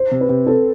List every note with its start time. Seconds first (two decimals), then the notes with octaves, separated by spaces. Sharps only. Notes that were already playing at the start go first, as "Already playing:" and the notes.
Already playing: C5
0.11 C3
0.21 B4
0.29 C3
0.47 C4 A4